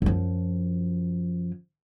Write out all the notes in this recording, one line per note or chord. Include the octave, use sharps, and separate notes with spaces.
F#2 F3